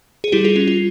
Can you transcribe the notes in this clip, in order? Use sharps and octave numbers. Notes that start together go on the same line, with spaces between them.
G#4
G3 E4 G4
F4 G#4
C#4 F4
F4